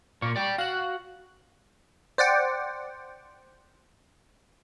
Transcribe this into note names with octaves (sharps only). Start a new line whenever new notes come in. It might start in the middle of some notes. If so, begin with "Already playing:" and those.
A#2 A#3 C#6
D5 G5
F#4 F5 F#6
C5 D5 F#5 G5